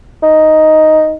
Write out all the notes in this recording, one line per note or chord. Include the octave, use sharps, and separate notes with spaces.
D#4